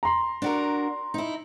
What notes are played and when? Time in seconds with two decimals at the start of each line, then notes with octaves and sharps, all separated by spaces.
0.03 A#5 C6
0.42 D4 F#4 A#4
1.14 D#4 E4